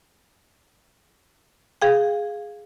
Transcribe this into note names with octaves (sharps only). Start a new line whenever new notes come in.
G#4 F5 G5